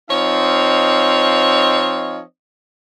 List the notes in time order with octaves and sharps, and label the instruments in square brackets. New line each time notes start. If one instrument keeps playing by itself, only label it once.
[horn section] F3 C4 D#4 C#5 D#5 F5